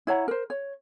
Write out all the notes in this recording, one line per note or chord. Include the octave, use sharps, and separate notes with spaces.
E4 C#5 F#5 A#5
A#4 C5
C#5